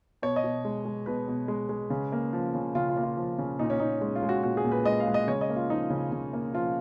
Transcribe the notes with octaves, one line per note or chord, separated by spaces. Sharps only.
B2 C#5
D#5
B2
G#3
G#3
B2 B4
B2
G#3
G#3
C#3
A#3
F3
C#3
C#3 F4
F4
A#3
F4
F3
C#3
A#2 D#4
C#4
A#2 D#4
G#3 C#4
F4
G#3
F#4
A#2 F#4
G#4
A#2
B4
G#3 D#5
F5
G#3
D#5
C#3 C#5
D#5
A#3
F4
F3 D#4
C#3
C#3
A#3
F3 F4